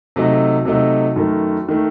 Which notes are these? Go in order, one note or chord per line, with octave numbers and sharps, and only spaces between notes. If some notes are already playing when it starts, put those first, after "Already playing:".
C3 F#3 A3 D#4
C3 F#3 A3 D#4
F#2 D#3 A3
D#3 A3